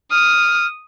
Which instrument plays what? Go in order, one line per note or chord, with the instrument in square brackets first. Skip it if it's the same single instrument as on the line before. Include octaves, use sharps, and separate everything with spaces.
[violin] D#6 [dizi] F6